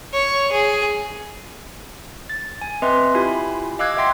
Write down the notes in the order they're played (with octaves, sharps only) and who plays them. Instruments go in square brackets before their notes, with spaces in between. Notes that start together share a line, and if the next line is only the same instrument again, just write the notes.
[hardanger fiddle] C#5
G#4
[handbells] A6
G#5
C4 B4 D#5 E5 C6
E4 F4 G4 G#5 B5
D#5 F5 D6 E6 F#6 G#6
E5 F#5 G5 C6 A#6 C7